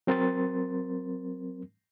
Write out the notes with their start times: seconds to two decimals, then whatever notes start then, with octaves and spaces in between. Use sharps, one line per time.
0.07 F#3 C4 A#4 C6 A6